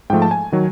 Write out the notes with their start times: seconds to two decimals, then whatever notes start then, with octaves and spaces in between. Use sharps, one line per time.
0.10 G#2 F3 A3 G5
0.22 A5
0.31 G#5
0.52 D#3 F#3